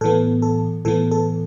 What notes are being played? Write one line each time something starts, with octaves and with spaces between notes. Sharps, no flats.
A2 E3 B3 A4
A4
A2 E3 B3 A4
A4